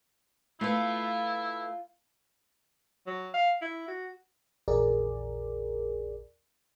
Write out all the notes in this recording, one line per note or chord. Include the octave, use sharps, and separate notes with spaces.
A3 E4 F4 B4
F#3
F5
E4
F#4
A#1 E2 G#4 A#4 D5